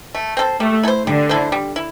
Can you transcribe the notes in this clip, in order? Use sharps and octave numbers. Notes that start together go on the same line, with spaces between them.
A3
C4 A4 C5
G3 A3
E4 A4 C5
D3 G3
E4 A4 C5
G3
E4